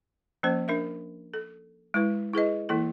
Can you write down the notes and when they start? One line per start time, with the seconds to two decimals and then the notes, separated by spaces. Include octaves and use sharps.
0.43 F3 A#3 C#4 C5
0.68 D4 A#4 E5
1.34 A4
1.94 G#3 E4 B4
2.33 E4 G#4 B4 D#5
2.69 E3 A#3 E4 A4